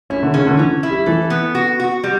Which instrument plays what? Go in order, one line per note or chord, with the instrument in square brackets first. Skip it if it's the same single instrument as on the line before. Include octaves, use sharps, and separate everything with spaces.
[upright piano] C#4 [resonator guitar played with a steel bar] E4
[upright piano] D3
[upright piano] C#3 [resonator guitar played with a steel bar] C#4
[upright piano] D3
[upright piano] E3 [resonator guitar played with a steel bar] C#4
[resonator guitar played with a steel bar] E4
[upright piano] G3
[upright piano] E3 [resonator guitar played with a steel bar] A4
[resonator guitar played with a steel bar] B3
F#4
F#4
G3